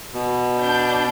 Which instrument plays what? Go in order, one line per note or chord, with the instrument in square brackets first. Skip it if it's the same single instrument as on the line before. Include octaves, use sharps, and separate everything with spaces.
[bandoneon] B2
[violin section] D4 G6